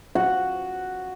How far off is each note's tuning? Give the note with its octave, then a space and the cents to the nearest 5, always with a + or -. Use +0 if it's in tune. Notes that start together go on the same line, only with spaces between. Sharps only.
F#4 +0 F#5 +0